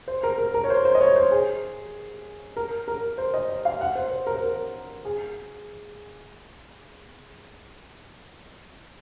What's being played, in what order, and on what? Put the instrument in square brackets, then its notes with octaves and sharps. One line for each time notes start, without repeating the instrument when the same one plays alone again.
[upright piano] C5
A#4
A#4
A#4
C#5
C5
C5
D#5
C#5
C5
G#4
A#4
A#4
C5
D#5
D#5
F5
F#5
C5
C5
A#4
C5
A#4
G#4